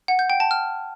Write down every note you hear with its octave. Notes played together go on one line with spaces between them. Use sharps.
F#5
G6
G5
A5
F6